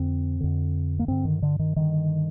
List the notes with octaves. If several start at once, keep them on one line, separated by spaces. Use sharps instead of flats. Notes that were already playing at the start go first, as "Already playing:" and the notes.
Already playing: F2 D3 C4
F2 D3
A#3
G2 D3 C4
D#3
D3
D#3
G2 D3 D#3